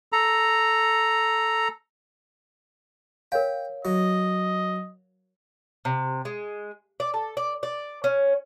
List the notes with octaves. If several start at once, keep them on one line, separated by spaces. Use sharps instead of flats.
A4 A#5
A#4 C#5 F5 G5
F#3 D#5
C3
G#3
D5
A4
D5
D5
C#4